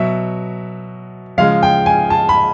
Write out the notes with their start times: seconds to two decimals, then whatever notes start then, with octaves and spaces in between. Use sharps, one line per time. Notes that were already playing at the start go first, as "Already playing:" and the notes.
Already playing: B2 F#3 E5
1.38 C#3 F3 G#3 F5
1.63 G5
1.86 G#5
2.10 A5
2.29 B5